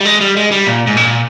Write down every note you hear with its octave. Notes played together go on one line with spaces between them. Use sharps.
G3
G#3
G3
G#3
G3
A#2
G#2
A#2